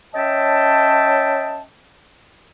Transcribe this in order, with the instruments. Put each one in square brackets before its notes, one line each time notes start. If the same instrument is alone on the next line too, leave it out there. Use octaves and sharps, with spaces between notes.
[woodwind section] C#4 C#5 D#5 E5 G5 A5